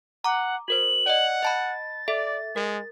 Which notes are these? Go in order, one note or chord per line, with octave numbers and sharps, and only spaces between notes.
F#5 A#5 D6
F#4 A#4 C5 F#7
D5 D#5 F#5
D#5 A5 B5 A6
A4 D5 E5
G#3 A#4